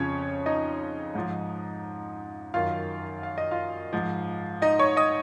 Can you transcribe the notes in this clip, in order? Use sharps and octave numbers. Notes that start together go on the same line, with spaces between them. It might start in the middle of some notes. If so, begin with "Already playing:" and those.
Already playing: F2 C#3 F3 C#4 C#5
D#4 D#5
G#2 F3
F#2 D#3 F4 F5
F5
D#5
F4 F5
G#2 F3
D#4 D#5
C#5 C#6
D#5 D#6